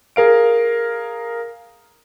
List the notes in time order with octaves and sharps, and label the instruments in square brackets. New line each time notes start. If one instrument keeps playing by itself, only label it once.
[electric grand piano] G#4 A#4 F5 D7